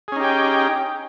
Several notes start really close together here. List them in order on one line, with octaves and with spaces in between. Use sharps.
G#4 C#4 D#4 G4 G5